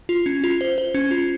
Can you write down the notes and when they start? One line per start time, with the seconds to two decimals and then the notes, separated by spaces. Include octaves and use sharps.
0.09 F4
0.26 C#4
0.44 F4
0.61 C5
0.78 C5
0.94 C#4
1.11 F4